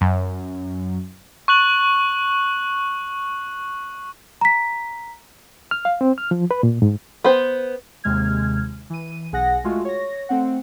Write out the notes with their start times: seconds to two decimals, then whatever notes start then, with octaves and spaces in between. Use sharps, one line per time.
0.01 F#2
1.48 C#6 F#6 F#7
4.41 A#5 B6
5.71 F6
5.85 F5
6.01 C4
6.18 F6
6.31 F3
6.51 B4
6.63 A#2
6.82 G#2
7.24 B3 C5
8.04 D#2 C3 G#3 F6 G#6
8.90 E3 D#7
9.32 B1 G#4 F#5 A#6
9.64 G#3 A3 F4 F#4
9.85 C#5 A#6
10.29 A3 C4 F#5